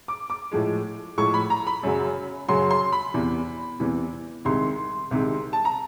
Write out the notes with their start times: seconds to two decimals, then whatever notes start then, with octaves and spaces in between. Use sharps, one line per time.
0.08 D6
0.30 D6
0.52 A2 F3 G#3
1.18 A2 F3 G#3 C#6
1.34 B5
1.50 A#5
1.67 B5
1.83 F#2 C#3 F#3
2.48 F#2 C#3 F#3 C6
2.71 C6
2.92 B5
3.14 E2 C3 E3
3.80 E2 C3 E3
4.45 C2 C3 D#3 G#3 C6
5.11 C2 C3 D#3 G#3
5.53 A5
5.65 A#5